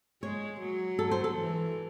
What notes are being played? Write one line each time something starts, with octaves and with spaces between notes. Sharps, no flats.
G#3 C#5
F#3
A4
C5
A4
E3